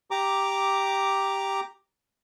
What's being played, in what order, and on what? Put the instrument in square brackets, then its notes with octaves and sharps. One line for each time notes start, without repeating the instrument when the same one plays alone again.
[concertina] G4 A#5 D6